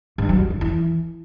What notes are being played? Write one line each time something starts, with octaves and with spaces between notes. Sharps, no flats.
G2
F#3
F2
F2
E3